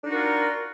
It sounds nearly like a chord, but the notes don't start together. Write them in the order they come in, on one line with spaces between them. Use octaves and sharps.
D4 D#4 F#4 A#4 F4